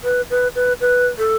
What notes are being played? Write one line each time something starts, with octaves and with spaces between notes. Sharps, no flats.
B4
B4
B4
B4
A4